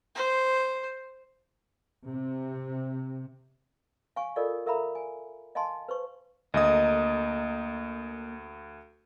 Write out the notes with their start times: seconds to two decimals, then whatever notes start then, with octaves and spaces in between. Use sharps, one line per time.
0.15 C5
2.07 C3
4.16 F5 G#5 C#6
4.36 F4 A4 A#4 D5 D#5 F5
4.66 A4 A#4 E5 F5 A#5 B5
4.95 G#5
5.55 D#5 F5 G#5 A5 C6
5.89 B4 C5 C#6
6.54 D2 A#3 A4 D#5 D#6